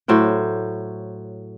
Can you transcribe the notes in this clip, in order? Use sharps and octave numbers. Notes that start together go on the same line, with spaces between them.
A2 F#3 C5 G5